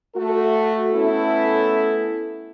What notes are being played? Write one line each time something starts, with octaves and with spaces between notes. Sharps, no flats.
A3 F#4 A4
A3 B3 C#4 E4 A4